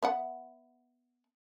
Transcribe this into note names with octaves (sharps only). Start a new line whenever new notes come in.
B3 E5 F#5